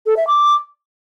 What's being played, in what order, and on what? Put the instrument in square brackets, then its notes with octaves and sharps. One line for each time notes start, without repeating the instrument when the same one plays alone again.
[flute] A4
E5
D6